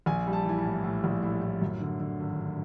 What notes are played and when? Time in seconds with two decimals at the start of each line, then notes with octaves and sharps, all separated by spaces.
0.06 A#1 G#5
0.27 G3
0.33 A5
0.45 E3 G#5
0.59 A5
0.65 A2
0.84 A2
1.04 A#1
1.22 A2
1.42 A2
1.62 F#2
1.80 D3
2.00 D3
2.20 G#1